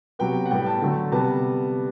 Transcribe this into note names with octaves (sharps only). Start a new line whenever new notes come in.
C3 F#3 B3 G5
F#5
A2 G3 B3 G5
A5
D3 F#3 A3
C3 G3 B3 A5